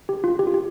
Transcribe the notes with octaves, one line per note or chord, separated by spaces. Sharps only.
G4
F4
G4
F4
G4